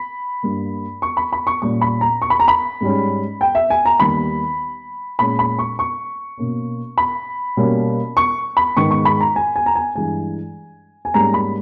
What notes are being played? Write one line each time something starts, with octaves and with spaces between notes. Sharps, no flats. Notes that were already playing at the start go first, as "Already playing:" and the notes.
Already playing: B5
G2 G3 A#3
C#6
B5
B5
C#6
A#2 G3 C#4 C#6
B5
A#5
C#6
B5
A#5
B5
G#2 G3 C#4
G5
E5
G#5
A#5
D#2 D#3 G3 B3 B5
A#2 G#3 C#4 B5
B5
C#6
C#6
B2 A#3 C#4
B5
B2 G3 A#3 C#4
C#6
B5
G#2 D#3 G#3 B3 C#6
C#6
B5
A#5
G#5
G#5
A#5
G#5
G2 E3 G#3 G#5
G#5
G#2 G3 A#3 C#4 A#5
B5